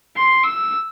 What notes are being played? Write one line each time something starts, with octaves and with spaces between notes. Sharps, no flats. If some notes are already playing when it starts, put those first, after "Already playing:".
C6
E6